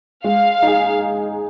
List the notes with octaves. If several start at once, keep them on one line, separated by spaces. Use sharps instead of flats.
G#3 F5
D#4
G#4